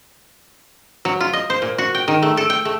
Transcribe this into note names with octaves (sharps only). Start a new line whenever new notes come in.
F#3
F4
D#5
C5
A#2
F#4
G5
D#3
A3
A4
G5
A3